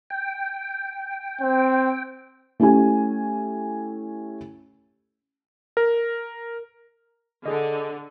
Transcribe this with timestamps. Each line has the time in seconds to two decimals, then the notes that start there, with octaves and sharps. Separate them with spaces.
0.10 G5
1.41 C4
2.60 A3 C#4 E4 G4 G#5
5.77 A#4
7.46 D3 G#4 D#5